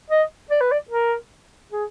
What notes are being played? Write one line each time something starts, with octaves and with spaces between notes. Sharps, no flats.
D#5
D5
B4
D5
A#4
G#4